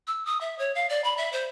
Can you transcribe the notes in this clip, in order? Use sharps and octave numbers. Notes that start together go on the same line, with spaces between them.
E6
D#6
E5
C#5
F5
D5
B5
E5
C5